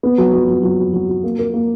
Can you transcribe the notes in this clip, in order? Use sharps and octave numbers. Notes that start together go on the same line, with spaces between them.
B3
F#3
F#3
F#3
F#3
F#4
F#3
F#4
A#3
A#4
A#3